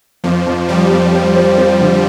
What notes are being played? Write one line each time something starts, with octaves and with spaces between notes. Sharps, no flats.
F2 F3
F2
F3 G3
F2
C4
C4
C4
D3